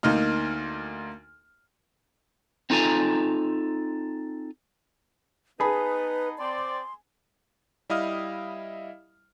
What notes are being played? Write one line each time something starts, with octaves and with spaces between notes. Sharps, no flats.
D2 A#3 D#4 F6
C4 D#4 F4 A4 G#5 A#5
B3 D#4 G#4 B4 A5 B5
C4 D5 C6
G3 E4 D#5 F5 D#6 F6